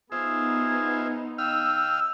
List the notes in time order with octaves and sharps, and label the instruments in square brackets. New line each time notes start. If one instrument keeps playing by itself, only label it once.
[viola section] B3 D#4 [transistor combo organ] F4 C5 E5 [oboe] G#4
[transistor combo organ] D#5 F5 F6 [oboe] G5 [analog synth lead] E6